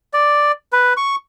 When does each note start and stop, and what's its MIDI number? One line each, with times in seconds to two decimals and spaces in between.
0.13 0.52 74
0.73 0.93 71
0.97 1.16 85